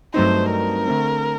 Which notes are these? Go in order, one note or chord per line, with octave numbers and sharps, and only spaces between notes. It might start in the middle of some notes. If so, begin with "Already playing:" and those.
G2 F#3 A3 C4 D#4 C5
A#4
D3 A3 C4